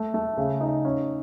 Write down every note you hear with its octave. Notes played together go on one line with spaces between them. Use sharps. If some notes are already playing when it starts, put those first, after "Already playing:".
Already playing: A3
A3
C#3
D#4
C#4